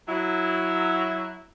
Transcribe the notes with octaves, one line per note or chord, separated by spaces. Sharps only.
F#3 E4